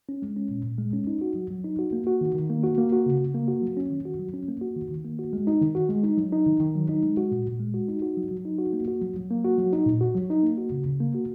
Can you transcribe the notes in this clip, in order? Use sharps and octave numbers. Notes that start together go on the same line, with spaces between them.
C#4
G#3
C#4
A#2
A#2
G#3
C#4
D#4
F#4
F#3
F#3
D#4
F#4
A#3
F#4
D#3
D#3
A#3
F#4
A#3
F#4
C#3
C#3
A#3
F#4
F#3
C#4
D#3
F#4
F#3
C#4
A#3
F#4
D#3
D#3
A#3
F#4
G#3
D#4
D#3
F#4
G#3
D#4
F#3
D#4
D#3
D#3
F#3
D#4
G#3
F#4
A#2
A#2
G#3
F#4
D#4
F#4
F#3
F#3
D#4
F#4
A#3
F#4
F#3
F#3
A#3
F#4
F#3
D#4
A#2
F#4
F#3
D#4
A#3
F#4
C#3
C#3
A#3
F#4